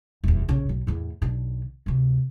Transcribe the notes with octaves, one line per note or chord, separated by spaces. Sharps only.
D#1 E2
A#1 C#3
B1
E2 A2
B1 D3
D2 C3